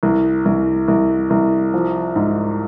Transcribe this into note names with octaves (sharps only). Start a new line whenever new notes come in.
C2
C2
C2
C2
F3
G#2